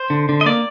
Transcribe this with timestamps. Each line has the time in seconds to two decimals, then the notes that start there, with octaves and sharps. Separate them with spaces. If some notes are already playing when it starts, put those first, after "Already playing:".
Already playing: C5
0.10 D3
0.29 D3
0.41 D#5
0.46 A#3 D5